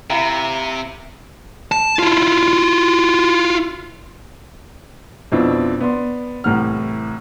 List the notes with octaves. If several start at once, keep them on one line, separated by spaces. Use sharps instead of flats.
C3 E4 F5 G5 A#5 B5
A5
E4 F4
F2 B2 C4 D4 E4 F4
B3 D5 C6
C2 A2 E3 F#5 F6